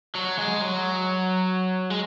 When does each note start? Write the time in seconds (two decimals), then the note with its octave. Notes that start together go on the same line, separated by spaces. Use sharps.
0.15 F#3
0.38 G#3
0.62 F#3
1.90 G#3